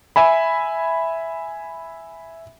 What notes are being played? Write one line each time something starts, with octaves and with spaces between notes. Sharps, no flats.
E5 G#5 B5